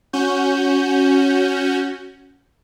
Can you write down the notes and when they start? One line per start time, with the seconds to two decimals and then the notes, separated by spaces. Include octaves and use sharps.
0.13 C#4 F#4 G6